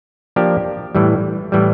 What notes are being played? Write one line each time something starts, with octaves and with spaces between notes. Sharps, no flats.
F3 A#3 D4 G4
A2 E3 G3
A2 E3 G3